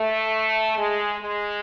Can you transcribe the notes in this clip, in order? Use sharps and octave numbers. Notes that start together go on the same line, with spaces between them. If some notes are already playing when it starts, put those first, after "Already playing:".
Already playing: A3
G#3
G#3